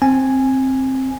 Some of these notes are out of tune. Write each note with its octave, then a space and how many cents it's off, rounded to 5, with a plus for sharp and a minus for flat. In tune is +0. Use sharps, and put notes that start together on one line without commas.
C4 +10 G#5 +0